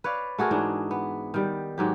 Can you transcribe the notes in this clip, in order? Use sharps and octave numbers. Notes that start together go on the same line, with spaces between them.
B4 C#5 D5 F5
A3 F#4 G#4 A#4
G#2 E3 D4 D#4
B3
D#3 G3
G#2 F#3 G4